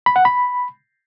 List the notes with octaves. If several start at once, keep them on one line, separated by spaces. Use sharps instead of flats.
B5
F#5
B5